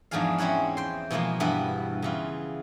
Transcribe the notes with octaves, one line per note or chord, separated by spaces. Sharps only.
E2 G#2 F3 D4 G#4 F5
C4 C#4 E4 C#5 F#5
G5 C6
B2 E3 F3 G#3 A#3
G2 E3 B3
C#3 E3 F4